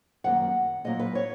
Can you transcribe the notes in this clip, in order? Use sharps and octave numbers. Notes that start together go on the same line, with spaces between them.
F#2 D#3 A#3 F#5
A#2 F#3 A#3 D#5
B4
C#5